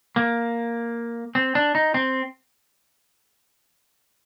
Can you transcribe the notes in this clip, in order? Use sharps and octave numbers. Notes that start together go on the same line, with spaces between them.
A#3
C4
D4
D#4
C4